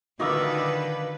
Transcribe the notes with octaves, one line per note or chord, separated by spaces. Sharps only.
D3 D#3 D#4 F4 F#4 B4 D6 E6